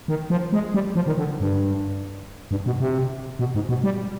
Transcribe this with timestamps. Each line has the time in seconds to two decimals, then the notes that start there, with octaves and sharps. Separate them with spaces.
0.08 D#3
0.30 F3
0.52 G#3
0.74 G3
0.95 F3
1.07 D#3
1.18 D3
1.40 G2
2.51 G2
2.66 B2
2.80 C3
3.39 B2
3.55 G#2
3.69 B2
3.84 G3